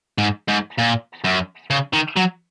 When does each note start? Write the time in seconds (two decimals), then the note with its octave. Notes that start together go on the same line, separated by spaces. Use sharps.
0.18 G#2
0.48 G#2
0.79 A#2
1.24 F#2
1.70 C#3
1.93 D#3
2.16 F#3